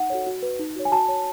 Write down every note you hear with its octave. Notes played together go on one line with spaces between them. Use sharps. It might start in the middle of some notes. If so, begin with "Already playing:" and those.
Already playing: D#4 F#5
F#4 A4 C#5
F#4
B4
D#4
F#4 C#5
G#5
F#4 A5
C#5